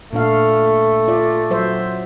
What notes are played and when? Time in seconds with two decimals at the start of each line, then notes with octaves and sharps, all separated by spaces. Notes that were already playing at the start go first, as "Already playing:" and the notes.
0.13 A#2 A3 D4 F5
1.08 F4 D5
1.51 F#3 C5 E5